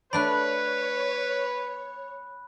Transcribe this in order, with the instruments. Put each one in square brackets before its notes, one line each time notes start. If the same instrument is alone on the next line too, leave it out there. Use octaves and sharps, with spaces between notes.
[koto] A3 D4 D5 [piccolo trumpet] B4 [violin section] C#5 [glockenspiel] B5 F#6